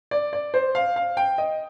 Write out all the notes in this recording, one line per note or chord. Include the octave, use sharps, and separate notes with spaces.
D5
D5
C5
F5
F5
G5
D#5